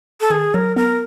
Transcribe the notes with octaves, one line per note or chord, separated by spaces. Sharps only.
A4
D#3 G#4
F#3 A#4
B3 A#4